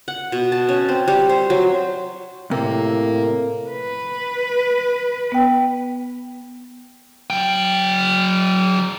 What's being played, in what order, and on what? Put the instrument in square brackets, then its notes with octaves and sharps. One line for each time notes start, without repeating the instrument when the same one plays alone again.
[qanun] F#5
B2
A5
C#4
C4
G3
C5
F#3
[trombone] A2 [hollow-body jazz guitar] C3 [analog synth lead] A#3
[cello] B4
[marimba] B3 G5
[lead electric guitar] F#3 G5